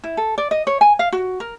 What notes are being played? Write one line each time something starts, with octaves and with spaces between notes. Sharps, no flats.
E4
A4
D5
D#5
C#5
G#5
F5
F#4
A#4